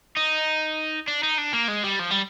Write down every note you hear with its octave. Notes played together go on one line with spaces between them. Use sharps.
D#4
D4
D#4
D4
A#3
G#3
G3
F3
G3